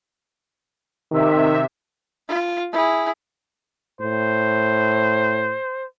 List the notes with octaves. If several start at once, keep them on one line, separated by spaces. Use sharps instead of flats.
C3 D#3 E5
F4
E4 G#4
A2 C5